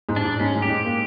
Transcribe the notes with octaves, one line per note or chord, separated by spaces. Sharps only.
G#2
D4
G#2
G#2 C#4
G#3
G4
G#2
A#3